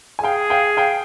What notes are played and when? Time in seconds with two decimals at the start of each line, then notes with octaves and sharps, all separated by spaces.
0.19 G#5
0.23 G#4 F5 G5
0.50 F5 G5
0.77 F5 G5